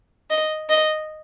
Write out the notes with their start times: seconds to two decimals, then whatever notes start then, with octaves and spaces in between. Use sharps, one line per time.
0.30 D#5
0.70 D#5